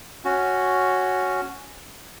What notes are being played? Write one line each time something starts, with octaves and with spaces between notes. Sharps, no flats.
C#4 F#4